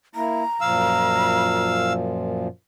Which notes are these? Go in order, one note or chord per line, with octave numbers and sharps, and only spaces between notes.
A#3 E4 A#5
F#2 A#2 F3 F5 E6